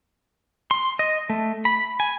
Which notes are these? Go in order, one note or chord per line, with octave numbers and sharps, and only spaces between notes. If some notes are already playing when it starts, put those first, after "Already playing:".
C6
D#5
A3
B5
G#5